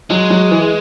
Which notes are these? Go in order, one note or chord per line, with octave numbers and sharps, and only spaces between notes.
F#3 G#3
F#3
E3